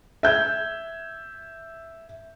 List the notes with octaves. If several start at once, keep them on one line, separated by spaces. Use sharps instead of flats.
E5 G6 G#6